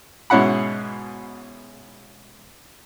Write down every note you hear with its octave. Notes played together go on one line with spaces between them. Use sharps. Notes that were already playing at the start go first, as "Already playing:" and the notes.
G#2 B2 C#4 E4 F#5 B5